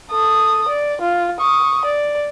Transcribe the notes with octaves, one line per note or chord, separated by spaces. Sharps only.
A4 D#6
D5
F4
C#6 D#6
D5